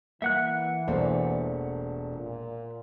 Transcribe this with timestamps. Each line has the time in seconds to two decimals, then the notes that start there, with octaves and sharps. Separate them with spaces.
0.22 E3 A#3 E5 F#5 F#6
0.88 E1 A3 A#3 C5 D5
2.13 A#2